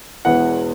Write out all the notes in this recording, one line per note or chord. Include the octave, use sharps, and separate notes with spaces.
E1 E2 E3 B3 E4 F#5